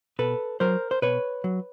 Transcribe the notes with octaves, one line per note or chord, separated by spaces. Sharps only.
B2 A4 B4
F#3 A#4 C5
C5
B2 B4 C#5
F#3